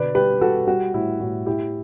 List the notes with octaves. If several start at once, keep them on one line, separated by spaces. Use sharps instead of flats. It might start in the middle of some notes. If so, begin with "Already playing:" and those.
Already playing: B2 D3 B4 D5
G3 G4 B4
G3 F#4 A4
G3 F#4
A2 E4
A2 F#4
A2 E4 G4